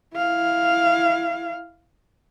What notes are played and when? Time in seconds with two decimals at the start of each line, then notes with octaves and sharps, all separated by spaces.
0.16 E4 F5